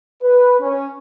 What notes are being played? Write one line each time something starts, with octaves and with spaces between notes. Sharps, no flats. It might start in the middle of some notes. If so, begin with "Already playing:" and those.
B4
C#4